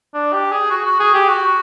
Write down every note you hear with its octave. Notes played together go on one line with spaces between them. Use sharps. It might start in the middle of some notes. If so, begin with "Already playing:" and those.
D4
G4
G#4
F#4
F#4
G#4
G4
F#4